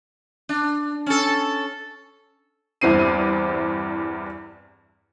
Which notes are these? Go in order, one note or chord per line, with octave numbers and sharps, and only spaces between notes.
D4
C#4 A4
E2 G2 E3 C4 C7 D#7